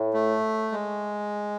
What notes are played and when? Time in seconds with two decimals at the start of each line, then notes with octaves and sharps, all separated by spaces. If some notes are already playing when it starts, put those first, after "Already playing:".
Already playing: A2
0.14 A3
0.72 G#3